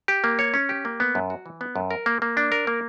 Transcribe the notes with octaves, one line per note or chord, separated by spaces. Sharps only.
G4
A#3
C#5
C#4
G4
A#3
B3
F#2
F#4
E3
B3
F#2
A#4
A#3
A#3
D4
A#4
A#3